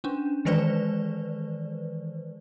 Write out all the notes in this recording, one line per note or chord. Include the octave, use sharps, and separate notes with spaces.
C#4 D4
D#3 E3 G#3 B4 C5 D5